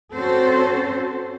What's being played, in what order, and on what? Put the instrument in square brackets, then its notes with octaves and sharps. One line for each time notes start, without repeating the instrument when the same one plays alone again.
[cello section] C4 C#4 F#4 A4 C5